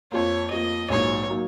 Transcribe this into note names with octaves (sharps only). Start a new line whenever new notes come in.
F2 F3 A#3 C#5
F2 F3 A#3 D#5
A#1 G#2 F#3 A#3 D#4 C#5
F#3 A#3 D#4